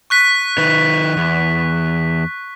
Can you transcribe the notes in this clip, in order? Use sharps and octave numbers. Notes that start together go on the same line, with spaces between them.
C#6 F#6 B6
D#3 D#4 B4
E2